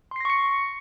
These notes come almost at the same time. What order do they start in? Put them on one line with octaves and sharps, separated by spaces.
C6 C7 A#6 C#6 C#7